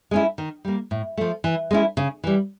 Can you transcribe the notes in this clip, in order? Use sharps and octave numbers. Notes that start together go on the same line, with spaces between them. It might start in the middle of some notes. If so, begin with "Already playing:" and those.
G#3 C#4 E4
D#3
G3 A#3
A2
F3 A3
E3
G#3 C#4 E4
C#3
E3 G3